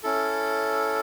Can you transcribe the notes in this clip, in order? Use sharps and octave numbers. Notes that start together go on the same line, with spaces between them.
C#4 E4 A4